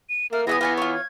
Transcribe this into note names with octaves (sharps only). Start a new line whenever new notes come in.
D#7
A3 A#3 F6
E3 B3 G#4 E5 D#6 A#6
E3 B3 F4 G#5 C#6
F4 C#5 C#6
G#6